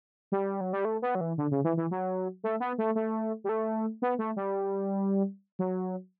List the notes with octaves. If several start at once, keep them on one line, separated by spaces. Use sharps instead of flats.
G3
F#3
G3
A3
B3
F#3
E3
D3
C#3
E3
E3
F#3
A3
B3
A3
A3
G3
A3
B3
A3
G3
F#3